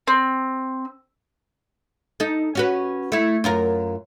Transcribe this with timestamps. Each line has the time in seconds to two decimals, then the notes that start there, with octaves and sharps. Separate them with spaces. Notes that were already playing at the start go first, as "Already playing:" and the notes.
0.08 C4
2.20 D#4 A4
2.55 C#4 F#4 B4
3.12 A3 E4
3.44 F#2 F4 A#4